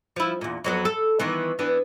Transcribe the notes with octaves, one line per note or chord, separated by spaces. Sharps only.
F3 E4
E2 A#2
F2 F#3 B3
A4
D#3 E3 B3
E3 B3 D4